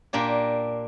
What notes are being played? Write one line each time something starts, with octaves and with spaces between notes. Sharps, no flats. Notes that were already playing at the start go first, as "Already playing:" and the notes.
A#2 A#3 D4 G4